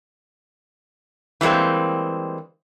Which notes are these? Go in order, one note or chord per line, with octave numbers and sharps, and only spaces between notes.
E3 G3 G#3 A#3 C4